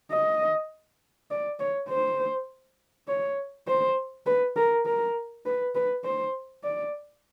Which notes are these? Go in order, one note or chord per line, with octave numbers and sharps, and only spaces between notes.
D#5
D5
C#5
C5
C#5
C5
B4
A#4
A#4
B4
B4
C5
D5